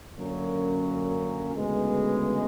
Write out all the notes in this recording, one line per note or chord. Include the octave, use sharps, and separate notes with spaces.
F#2 D3 F#3 A#3 C#4
D2 C#3 E3 G#3 B3